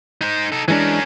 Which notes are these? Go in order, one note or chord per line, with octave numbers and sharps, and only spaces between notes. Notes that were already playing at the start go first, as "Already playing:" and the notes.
D#4 C5
D#4 A4
E3 G#3 C#4 D4 A#4